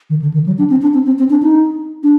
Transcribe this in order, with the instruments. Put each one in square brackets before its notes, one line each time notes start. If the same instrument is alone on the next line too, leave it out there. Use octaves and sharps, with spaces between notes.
[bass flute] D#3
D3
D#3
F#3
D4
C4
D4
C4
C4
C4
D4
D#4
D4